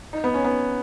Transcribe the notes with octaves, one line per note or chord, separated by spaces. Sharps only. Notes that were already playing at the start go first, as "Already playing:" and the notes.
D#4
B3
C#4
B3